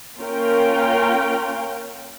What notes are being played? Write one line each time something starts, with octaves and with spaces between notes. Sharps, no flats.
A#3 C#4 F4 A#4 F5 G5